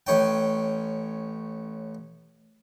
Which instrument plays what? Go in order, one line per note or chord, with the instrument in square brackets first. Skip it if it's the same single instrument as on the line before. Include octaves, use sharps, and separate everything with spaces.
[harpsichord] A1 C#4 G5